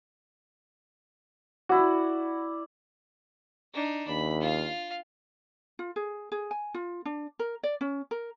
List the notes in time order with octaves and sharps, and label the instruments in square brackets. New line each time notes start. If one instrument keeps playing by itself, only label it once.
[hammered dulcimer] E4 D5 [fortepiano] F#4
[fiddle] D4 D#4
[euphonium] D#2 [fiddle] B5
[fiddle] F4 F5
[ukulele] F4
G#4
G#4
G#5
F4
D4
A#4
D5
C#4
A#4